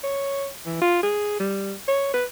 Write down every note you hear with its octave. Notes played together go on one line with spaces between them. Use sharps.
C#5
E3
F4
G#4
G3
C#5
B4